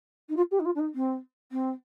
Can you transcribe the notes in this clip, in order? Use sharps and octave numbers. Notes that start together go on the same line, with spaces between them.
D#4
F4
G4
D#4
F4
D4
D#4
C4
C4